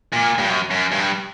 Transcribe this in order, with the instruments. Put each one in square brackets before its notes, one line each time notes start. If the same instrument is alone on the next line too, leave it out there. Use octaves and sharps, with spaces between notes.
[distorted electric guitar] A#2
G2
F#2
F#2
G2